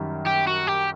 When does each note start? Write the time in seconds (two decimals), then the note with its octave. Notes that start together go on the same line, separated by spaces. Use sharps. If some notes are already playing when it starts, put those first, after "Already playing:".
Already playing: F#2 D#3 G3
0.26 G4
0.47 F#4
0.67 G4